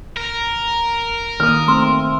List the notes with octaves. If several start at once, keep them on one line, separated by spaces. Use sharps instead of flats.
A#4
D#3 A#3 D#6 F6
A3 C4 C6 E6